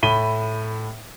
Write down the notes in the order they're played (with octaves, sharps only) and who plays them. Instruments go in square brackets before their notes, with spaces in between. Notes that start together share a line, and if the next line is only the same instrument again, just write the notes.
[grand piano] A2 B5 D#7 G7